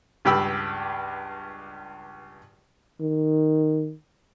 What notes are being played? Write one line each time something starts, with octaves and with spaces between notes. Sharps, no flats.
C#2 G2 G4 G5 B5 E6
D#3